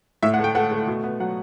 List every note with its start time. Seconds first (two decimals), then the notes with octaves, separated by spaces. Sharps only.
0.23 A2 E5
0.34 F#5
0.39 A3
0.44 G5
0.55 A3 F#5
0.71 A3
0.87 B2
1.03 B3
1.20 F#3 F#5